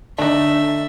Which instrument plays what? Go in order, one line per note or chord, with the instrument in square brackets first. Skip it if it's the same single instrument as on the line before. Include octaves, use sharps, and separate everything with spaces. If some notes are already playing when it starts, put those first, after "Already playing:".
[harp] D3 [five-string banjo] A3 D#4 [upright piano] D4 [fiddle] E5